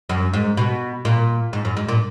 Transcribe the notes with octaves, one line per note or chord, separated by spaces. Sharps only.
F#2
G#2
B2
A#2
G#2
F#2
G#2
A#2